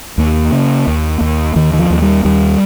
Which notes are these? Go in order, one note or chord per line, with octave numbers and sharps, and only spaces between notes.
D#2 A#3
C#3
D#2
D#2
D#2 D#3
D#3
F3
D#2
G3
D#2 G3